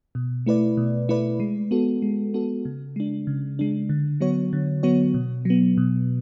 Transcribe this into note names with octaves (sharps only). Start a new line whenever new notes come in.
B2
A3 E4 B4 D5
B2
A3 E4 B4 D5
G#3
B3 F#4 A4
G#3
B3 F#4 A4
C#3
G#3 D4
C#3
G#3 D4
D3
F#3 B3 F#4 C#5
D3
F#3 B3 F#4 C#5
B2
F#3 B3
B2